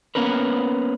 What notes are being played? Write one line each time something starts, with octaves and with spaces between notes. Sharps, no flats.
A#3 B3 C#4 A#4 B4